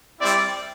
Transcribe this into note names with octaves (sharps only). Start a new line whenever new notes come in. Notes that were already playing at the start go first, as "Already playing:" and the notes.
G3 C4 E4 G4 D5